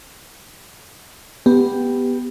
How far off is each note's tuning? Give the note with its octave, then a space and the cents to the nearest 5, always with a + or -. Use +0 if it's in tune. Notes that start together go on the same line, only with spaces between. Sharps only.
B3 +0 G4 +5